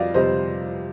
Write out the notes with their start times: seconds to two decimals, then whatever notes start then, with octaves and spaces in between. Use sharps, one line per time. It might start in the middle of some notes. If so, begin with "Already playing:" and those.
Already playing: F2 G3 D5 D#5 F5
0.14 F2 C3 G3 C4 C5 D#5